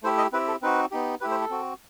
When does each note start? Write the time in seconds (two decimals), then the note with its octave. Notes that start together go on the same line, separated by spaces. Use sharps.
0.03 A3 E4 G4 C5
0.18 D#5
0.33 C4 E4 G4 B4
0.48 A4
0.62 C4 D#4 F#4 B4
0.91 B3 D#4 G4
1.21 A3 E4 G4 B4
1.31 C5
1.41 A4
1.50 C4 F#4